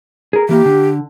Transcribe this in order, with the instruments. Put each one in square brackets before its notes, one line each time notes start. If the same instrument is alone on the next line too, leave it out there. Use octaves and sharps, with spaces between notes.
[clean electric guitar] G#4 A#4
[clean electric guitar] E3 A#3 [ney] G4
[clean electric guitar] D3